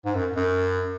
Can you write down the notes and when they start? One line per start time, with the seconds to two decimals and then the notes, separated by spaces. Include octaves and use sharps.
0.05 G#2
0.15 F#2
0.36 F#2